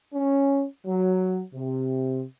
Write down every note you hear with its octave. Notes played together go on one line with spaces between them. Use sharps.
C#4
F#3
C3